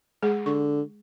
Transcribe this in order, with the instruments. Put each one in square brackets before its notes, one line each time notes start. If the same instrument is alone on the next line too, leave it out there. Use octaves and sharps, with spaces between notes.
[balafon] G#3 G#4
[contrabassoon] D3 [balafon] C#6